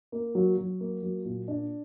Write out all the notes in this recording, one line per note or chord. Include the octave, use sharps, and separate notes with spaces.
A#3
F#3
F#3
A#3
F#3
A#2
D4